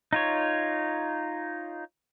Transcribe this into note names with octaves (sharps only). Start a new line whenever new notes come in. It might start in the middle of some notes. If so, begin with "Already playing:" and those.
D#4 F4 C#5